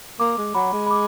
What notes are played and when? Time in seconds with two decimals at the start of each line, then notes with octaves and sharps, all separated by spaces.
0.20 A#3 D6
0.38 G#3
0.55 F#3 B5
0.73 G#3
0.87 B5
0.91 D6